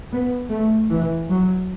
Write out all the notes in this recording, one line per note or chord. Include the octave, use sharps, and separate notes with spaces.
B3
A3
E3
F#3